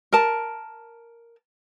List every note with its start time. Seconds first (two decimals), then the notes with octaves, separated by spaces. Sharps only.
0.13 A#4 A5